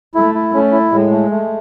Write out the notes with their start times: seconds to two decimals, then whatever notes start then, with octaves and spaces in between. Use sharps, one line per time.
0.15 A3 E4
0.35 E4
0.54 A3 C#4
0.72 E4
0.92 A2 G#3
1.11 A3
1.31 A3